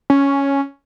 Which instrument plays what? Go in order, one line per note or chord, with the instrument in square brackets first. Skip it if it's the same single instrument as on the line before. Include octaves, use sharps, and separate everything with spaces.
[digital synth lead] C#4